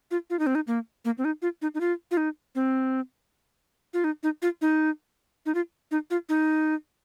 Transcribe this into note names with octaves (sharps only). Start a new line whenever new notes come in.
F4
F4
D#4
C4
D#4
A#3
A#3
C4
D#4
F4
D#4
D#4
F4
F4
D#4
C4
F4
D#4
D#4
F4
D#4
D#4
F4
D#4
F4
D#4